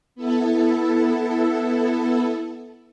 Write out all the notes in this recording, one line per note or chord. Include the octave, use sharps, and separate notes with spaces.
B3 E4 A4